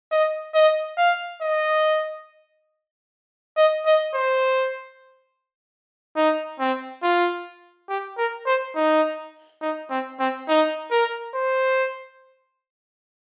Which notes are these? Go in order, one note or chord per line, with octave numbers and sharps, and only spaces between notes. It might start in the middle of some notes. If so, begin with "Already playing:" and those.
D#5
D#5
F5
D#5
D#5
D#5
C5
D#4
C4
F4
G4
A#4
C5
D#4
D#4
C4
C4
D#4
A#4
C5